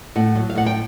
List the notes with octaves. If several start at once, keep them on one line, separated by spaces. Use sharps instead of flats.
A2 F#5
F#3
F5
A2 F#5
G5